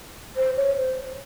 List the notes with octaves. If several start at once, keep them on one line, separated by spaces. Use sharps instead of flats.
C5
C#5
C5